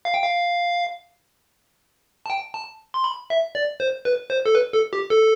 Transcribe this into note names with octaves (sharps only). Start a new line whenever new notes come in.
F5
G5
F5
A5
G5
A5
C6
B5
E5
D5
C5
B4
C5
A4
B4
A4
G4
A4